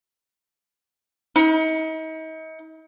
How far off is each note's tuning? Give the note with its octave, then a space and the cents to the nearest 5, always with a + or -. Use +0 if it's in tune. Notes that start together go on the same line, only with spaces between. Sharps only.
D#4 +40